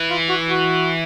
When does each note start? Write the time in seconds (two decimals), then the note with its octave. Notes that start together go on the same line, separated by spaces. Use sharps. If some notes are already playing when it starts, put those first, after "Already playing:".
Already playing: E3
0.10 F4
0.29 F#4
0.48 F#4